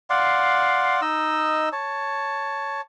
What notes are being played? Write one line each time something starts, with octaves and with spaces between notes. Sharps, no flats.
D5 F5 F#5 C6
D#4 D#5 E6
C#5 A5